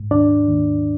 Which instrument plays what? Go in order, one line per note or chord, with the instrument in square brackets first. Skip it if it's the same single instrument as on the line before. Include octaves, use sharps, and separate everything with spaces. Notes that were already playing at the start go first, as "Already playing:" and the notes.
Already playing: [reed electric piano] G#2
D#2 D4 D5
D#2